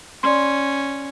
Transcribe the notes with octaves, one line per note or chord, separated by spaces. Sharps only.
C#4 D5 C6